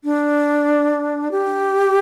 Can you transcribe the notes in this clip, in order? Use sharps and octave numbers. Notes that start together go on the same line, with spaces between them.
D4
G4